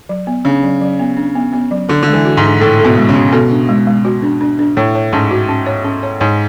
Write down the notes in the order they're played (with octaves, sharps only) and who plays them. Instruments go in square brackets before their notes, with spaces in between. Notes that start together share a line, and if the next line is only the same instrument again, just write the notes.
[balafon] F#3
B3
[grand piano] C#3 [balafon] D4
[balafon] F#3
F#3
B3
D4
B3
B3
F#3
[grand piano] D3 [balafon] A4
[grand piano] D3 [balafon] G#3
[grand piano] E3
[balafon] F#4
[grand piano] G#2
[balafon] D4
[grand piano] A2 [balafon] A4
[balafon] A4
[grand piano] B2
[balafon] G#3
[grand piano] C#3
[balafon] F#4
[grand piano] B2 [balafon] A4
[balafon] D4
G#3
G#3
F#4
D4
D4
D4
[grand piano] A2 [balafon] C#5
[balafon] C#5
[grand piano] G#2 [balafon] C#4
[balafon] F#4
C#4
C#5
C#4
C#5
[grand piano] G#2 [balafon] C#5